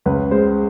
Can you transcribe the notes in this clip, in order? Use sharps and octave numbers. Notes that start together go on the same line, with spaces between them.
C#2 B4
G#3 C5